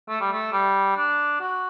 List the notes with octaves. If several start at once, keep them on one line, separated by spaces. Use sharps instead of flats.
A3
G3
A3
G3
D4
F#4